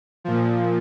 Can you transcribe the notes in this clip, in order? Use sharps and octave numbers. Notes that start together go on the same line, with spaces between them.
A#2 F3